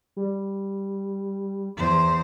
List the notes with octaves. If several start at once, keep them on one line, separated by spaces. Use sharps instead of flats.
G3
E2 C5